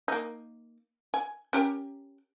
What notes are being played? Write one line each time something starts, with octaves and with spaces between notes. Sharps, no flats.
A#3 D#4
G#5
C#4 G4 A#4